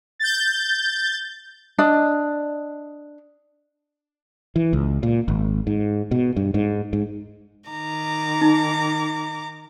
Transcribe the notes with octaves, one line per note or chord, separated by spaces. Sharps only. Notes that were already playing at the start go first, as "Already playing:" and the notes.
G6 A6
D4 D#5
E3
C#2
A#2
G#1
G#2
B2
G2
G#2
G#2
D#3 A#5 D6
D#4